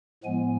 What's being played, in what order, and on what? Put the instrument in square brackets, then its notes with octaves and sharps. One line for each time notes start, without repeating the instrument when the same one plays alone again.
[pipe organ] A2 F3 G#3 B3 G#5